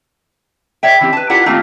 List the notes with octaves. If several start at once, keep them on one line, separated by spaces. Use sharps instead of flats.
C#5 D5 E5 G5
E3 C4 G4
B4 A5
E4 F4 G4 A#4 D5 F#5
D#3 A3 A#3 C4 D#4 F4